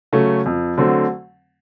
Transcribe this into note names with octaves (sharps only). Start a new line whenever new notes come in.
C#3 F#3 A3 C#4
F2
D3 F#3 A3 C4